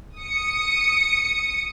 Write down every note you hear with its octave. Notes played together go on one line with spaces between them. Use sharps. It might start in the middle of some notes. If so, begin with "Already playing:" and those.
D#6 C#7